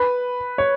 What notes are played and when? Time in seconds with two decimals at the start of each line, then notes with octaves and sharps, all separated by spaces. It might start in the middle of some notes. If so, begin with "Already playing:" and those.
Already playing: B4
0.58 C#5